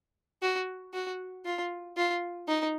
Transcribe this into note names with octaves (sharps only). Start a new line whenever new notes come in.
F#4
F#4
F4
F4
D#4